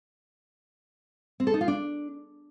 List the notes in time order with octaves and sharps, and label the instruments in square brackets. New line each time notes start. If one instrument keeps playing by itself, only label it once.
[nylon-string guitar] C4
A4
D#4
F4
D4